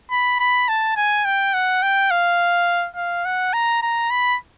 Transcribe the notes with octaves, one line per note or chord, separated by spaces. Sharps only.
B5
B5
A5
G#5
G5
F#5
G5
F5
F5
F#5
A#5
A#5
B5